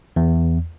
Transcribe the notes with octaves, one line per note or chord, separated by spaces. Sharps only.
E2